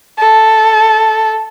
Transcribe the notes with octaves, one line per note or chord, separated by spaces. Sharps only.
A4